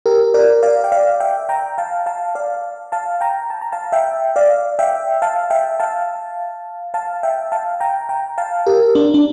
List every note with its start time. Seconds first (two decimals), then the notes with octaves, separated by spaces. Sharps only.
0.06 G4 A#4
0.34 A#4 D5
0.63 D5 F5
0.84 G5
0.92 D5 F5
1.20 E5 G5
1.49 G5 A#5
1.78 F5 A5
2.06 F5 A5
2.35 D5 F5
2.92 F5 A5
3.21 G5 A#5
3.50 A5
3.62 A#5
3.72 F5 A5
3.92 E5 G5
4.36 D5 F5
4.79 E5 G5
5.22 F5 A5
5.50 E5 G5
5.80 F5 A5
6.94 F5 A5
7.23 E5 G5
7.52 F5 A5
7.80 G5 A#5
8.09 G5 A#5
8.38 F5 A5
8.66 G4 A#4
8.95 D4
9.14 D4